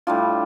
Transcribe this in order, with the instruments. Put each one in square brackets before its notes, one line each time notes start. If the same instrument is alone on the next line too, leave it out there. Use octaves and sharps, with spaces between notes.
[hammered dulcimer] A2 G3 D4 F4